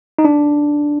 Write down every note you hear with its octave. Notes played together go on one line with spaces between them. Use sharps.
D#4
D4